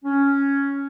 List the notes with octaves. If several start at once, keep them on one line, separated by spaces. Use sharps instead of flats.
C#4